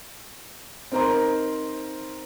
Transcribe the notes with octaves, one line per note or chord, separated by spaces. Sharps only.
C4 D#4 A#4 C5 A#5 C6